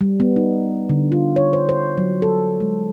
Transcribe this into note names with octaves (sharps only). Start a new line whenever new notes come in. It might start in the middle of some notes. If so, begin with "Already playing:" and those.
G3
B3
D#4
D3
F4
C#5
C5
C5
F#3
A4
G#3